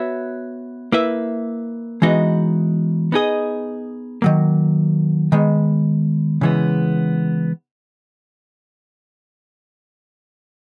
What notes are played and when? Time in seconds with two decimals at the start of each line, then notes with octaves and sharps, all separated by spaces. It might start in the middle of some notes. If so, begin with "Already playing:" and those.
Already playing: B3 F#4 C#5 E5
0.92 A#3 E4 B4 E5
2.02 E3 G#3 B3 D#4 F#4
3.12 B3 D#4 G#4 D#5
4.22 D#3 F#3 A#3
5.32 D#3 G#3 B3
6.41 C#3 E3 G#3 B3